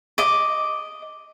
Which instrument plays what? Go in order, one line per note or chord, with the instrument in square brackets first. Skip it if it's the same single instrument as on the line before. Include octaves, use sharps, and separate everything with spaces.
[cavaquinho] D#5 D6